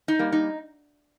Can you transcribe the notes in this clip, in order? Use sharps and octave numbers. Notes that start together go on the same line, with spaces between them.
D#4
G3 A#3
D#4